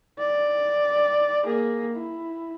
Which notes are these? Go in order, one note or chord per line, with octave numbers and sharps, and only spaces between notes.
D5
A#3 G#4
E4